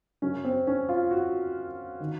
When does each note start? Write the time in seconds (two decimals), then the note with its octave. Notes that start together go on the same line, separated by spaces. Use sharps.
0.22 F#2 C#3 C#4
0.44 C4
0.67 C#4
0.89 F4
1.11 F#4
2.00 D#3